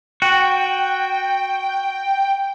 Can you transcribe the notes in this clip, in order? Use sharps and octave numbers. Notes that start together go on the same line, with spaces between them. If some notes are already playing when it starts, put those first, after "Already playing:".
F#4 G5